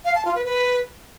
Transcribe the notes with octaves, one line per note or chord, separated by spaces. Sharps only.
F5
A5
F4
B4
B4